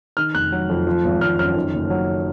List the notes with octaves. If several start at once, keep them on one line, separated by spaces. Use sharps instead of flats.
D#3 F6
F1 F#6
F#3
F2
F3
G#1
G#1 F6
F#2 F6
D#3
F#1
F#3